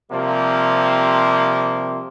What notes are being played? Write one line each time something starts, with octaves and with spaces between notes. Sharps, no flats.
C3 F3 G3 A#3